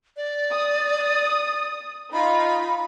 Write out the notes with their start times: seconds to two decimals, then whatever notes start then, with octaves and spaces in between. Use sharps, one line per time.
0.17 D5
0.52 D#6
2.13 D#4 F4 B5